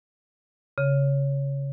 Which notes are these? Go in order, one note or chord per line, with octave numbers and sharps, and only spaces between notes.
C#3